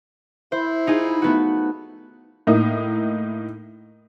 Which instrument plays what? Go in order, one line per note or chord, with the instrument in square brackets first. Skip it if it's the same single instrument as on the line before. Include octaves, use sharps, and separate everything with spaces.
[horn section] E4 [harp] C5
[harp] D#4 F4 G#4
A3 B3 F#4
[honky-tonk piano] A2 A#3 D#4 E4